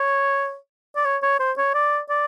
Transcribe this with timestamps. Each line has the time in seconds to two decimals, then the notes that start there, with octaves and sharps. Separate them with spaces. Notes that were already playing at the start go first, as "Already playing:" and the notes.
Already playing: C#5
0.96 D5
1.05 C#5
1.22 C#5
1.40 C5
1.58 C#5
1.75 D5
2.09 D5